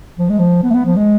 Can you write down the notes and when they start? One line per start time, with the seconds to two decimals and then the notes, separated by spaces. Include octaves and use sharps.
0.19 F3
0.29 G#3
0.39 F3
0.63 B3
0.70 A3
0.74 B3
0.86 F3
0.96 G#3